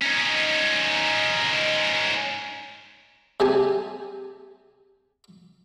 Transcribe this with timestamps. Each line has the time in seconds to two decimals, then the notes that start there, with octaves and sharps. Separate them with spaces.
0.02 C#4 D#4
3.40 C3 G4 G#4 G#5 A5